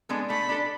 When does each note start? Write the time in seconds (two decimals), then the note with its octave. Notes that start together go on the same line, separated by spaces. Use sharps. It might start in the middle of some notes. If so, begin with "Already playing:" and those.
0.09 G#3 B3 D4 A4
0.30 A3 B5
0.49 D4 A4